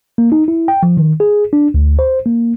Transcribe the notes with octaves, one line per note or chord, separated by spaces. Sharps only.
A#3
D#4
E4
G5
F3
D#3
G#4
D4
D2
C5
A#3